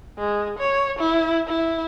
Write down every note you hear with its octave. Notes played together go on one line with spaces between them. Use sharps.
G#3
C#5
E4
E4